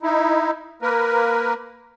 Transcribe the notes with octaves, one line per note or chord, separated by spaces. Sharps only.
D#4 E4
A#3 A#4 B4